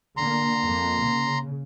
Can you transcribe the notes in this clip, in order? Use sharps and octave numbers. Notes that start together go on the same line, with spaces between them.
D3 A#3 A#5 C6
F2 A#3
C#3